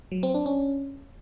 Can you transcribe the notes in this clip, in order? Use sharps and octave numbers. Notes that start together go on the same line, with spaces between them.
F#3
C4
D4
C#4